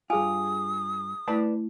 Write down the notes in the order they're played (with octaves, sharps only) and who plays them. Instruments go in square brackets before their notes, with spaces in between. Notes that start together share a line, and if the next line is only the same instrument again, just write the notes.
[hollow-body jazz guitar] G2 F4 [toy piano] G#4 G#5 [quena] D#6
[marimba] A3 E4 [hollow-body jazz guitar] B4 D5 A5